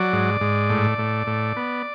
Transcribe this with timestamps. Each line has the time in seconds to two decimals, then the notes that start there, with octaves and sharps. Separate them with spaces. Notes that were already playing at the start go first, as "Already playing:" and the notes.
Already playing: F#3 D5
0.13 G#2
0.41 G#2
0.70 A2
0.98 A2
1.27 A2
1.57 B3